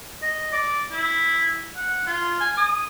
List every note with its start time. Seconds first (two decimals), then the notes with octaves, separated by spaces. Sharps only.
0.22 D#5
0.53 D5
0.91 E4
1.76 F#5
2.07 F4
2.40 G#5
2.57 D#6